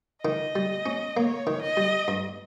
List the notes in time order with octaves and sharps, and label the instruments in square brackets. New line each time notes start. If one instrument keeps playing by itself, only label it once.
[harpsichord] D#3 [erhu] D#5
[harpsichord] G3
C#4
[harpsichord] A#3 [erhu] C#5
[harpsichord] D#3
[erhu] D#5
[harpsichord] G3
G2